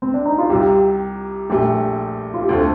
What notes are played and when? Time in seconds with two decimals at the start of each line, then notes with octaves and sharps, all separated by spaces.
0.02 C4
0.14 D4
0.25 D#4
0.38 F4
0.50 C2 C3 G3 G4
1.50 A#1 A#2 A3 G4
2.34 F4
2.42 G4
2.49 D2 D3 A3 C4 A4